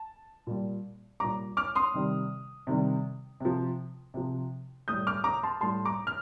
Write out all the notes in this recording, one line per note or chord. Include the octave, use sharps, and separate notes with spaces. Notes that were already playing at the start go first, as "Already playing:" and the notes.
Already playing: A5
A#2 G3
A#2 G3 A#5 D6
D6 F6
C6 D#6
C3 D#3 G3
C3 D#3 G3
C3 F3
C3 F3
A2 G3 D#6 G6
D6 F6
A#5 D6
A5 C6
A2 G3 A5 C6
A#5 D6
F6